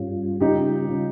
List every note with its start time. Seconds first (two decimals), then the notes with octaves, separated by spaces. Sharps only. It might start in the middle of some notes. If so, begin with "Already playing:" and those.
Already playing: G2 G3 C#4 F4
0.40 C#3 G3 C#4 D#4 F4 G4
0.89 C#3 G3 C#4 F4